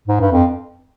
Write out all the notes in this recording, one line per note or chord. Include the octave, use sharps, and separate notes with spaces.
G#2
G2
F2